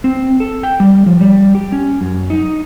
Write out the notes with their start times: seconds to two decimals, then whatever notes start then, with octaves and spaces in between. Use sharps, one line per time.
0.04 C4
0.40 A4
0.63 G5
0.80 G3
1.06 F3
1.21 G3
1.55 G4
1.72 C#4
2.01 F#2
2.30 D#4